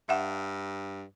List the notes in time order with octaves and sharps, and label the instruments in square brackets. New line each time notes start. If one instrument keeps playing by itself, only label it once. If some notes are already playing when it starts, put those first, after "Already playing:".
[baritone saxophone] G2 [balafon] E5 F#5